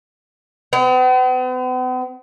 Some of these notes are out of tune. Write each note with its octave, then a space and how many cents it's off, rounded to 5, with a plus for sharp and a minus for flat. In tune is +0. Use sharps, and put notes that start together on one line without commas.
B3 +45